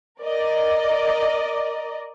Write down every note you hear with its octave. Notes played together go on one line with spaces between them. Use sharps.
A#4 D5 D#5